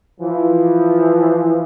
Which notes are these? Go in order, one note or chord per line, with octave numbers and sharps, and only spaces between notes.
E3 F3